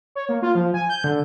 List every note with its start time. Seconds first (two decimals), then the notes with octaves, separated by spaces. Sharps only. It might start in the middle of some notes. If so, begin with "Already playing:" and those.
0.15 C#5
0.29 A#3
0.42 F4
0.55 F3
0.74 G#5
0.89 G6
1.04 D3